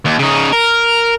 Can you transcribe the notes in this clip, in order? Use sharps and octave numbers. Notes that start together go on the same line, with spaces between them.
D#2
C#3 D#4
A#4